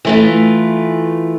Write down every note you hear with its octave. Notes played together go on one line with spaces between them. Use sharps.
E3 A3 F4